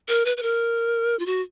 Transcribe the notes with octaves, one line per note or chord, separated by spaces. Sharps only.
A#4
B4
B4
A#4
F4
F#4